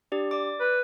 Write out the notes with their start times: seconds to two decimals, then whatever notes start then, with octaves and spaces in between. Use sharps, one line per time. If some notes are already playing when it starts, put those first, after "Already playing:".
0.12 D4 G4 D5
0.31 D5 D6
0.60 B4